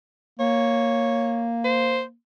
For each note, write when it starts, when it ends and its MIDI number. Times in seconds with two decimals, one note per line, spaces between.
0.39 2.14 58
0.39 1.50 73
1.64 2.02 72